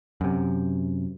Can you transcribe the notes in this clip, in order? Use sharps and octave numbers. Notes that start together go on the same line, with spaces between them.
F#2 C3